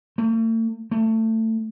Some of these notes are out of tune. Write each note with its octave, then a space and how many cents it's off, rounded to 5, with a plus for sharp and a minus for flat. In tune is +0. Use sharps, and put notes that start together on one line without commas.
A3 +45
A3 +20